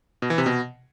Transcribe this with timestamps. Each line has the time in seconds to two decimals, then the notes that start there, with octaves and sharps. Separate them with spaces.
0.22 B2
0.30 E3
0.38 C3
0.46 B2